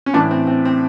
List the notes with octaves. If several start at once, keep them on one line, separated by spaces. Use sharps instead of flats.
C#4
A2 E3 D4
C4
C4
C4